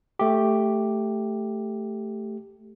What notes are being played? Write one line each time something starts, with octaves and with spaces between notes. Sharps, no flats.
A3 G4